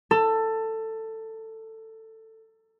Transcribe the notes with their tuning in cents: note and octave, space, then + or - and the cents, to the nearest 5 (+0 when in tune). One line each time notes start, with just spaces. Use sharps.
A4 +15